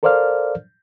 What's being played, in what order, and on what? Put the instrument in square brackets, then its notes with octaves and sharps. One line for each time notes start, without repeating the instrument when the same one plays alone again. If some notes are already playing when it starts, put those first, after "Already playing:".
[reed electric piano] A4 A#4 C5 D5 F5 F6